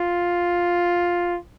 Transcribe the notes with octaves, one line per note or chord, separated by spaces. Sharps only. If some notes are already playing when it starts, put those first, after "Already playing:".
Already playing: F4